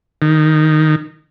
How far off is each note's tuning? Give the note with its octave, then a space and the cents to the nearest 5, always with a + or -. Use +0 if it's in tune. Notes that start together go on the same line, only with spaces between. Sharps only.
D#3 -5